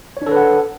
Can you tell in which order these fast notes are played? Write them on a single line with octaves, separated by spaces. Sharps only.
C#5 D4 A4 B4 F#5